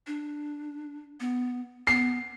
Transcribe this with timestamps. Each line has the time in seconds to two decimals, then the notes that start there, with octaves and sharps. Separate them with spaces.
0.07 D4
1.20 B3
1.87 B3 C7